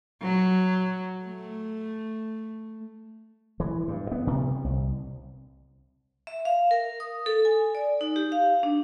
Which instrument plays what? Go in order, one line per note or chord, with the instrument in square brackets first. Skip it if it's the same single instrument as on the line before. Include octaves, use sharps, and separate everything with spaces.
[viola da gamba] F#3
A3
[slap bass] E3
G2
B3
C3
C2
[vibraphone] E5
F5
A#4
D#6
A4
G#5
D5
D#4
G4
F5
D4